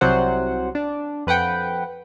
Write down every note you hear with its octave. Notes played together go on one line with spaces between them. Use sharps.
C2 C3 F#3 C5 F#5
D4
F2 B4 F#5 G5